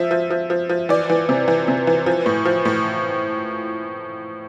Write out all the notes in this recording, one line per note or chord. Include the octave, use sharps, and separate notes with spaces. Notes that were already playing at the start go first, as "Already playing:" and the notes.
Already playing: F3 E5
F3
F3
F3
F3
E3 D5
E3
C3
E3
C3
E3
F3
A2
F3
A2